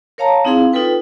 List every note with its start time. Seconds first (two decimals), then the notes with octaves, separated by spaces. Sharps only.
0.18 A#4 C#5 F5 A5 A#5
0.45 C4 D#4 E4 G#4 F5 C6
0.73 D#4 F4 A4 B4 G5